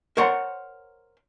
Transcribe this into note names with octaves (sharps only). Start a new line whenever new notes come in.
A#4 C5 C#5 F#5 C6